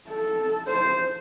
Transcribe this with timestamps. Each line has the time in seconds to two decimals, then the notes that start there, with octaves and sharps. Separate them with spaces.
0.08 A4
0.68 C5